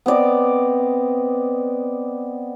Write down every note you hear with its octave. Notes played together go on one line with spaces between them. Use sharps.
B3 C4 D5 D#5